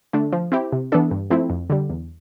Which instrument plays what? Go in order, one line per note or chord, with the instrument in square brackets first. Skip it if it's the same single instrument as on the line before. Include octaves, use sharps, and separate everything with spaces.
[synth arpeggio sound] D3 A3 D4
F3
C4 E4 G4
C3
E3 B3 D4 A4
G2
F3 A3 C4 E4
F2
D3 G3
E2